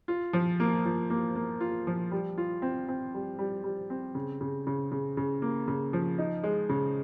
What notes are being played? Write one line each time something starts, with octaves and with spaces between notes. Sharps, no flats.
F4
F3
A#3
F3
A#3
A#3
F4
F3
G3
F4
C4
C4
G3
G3
G3
C4
C#3
C#3
C#3
C#3
C#3
A#3
C#3
F3
D#4
G#3
C#3